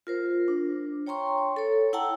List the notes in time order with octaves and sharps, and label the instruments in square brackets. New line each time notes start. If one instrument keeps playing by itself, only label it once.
[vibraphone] F4 A#4 C5
D4
C#5 G5 A#5 C6 C#6
A4 C#5
E4 F#5 G5 A5 A#5 E6